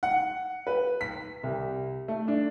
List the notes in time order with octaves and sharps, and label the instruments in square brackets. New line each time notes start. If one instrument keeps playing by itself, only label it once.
[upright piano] F#5
B4
B6
C2
A3
D4